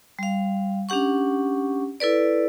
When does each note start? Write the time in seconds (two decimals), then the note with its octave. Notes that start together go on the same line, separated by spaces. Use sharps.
0.19 G3 F5
0.89 C#4 D4 G4 F#5 C#6
2.00 E4 A4 B4 D5